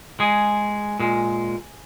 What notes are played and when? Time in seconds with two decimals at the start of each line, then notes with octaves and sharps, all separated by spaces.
0.20 G#3 G#4
1.00 A#2 G#3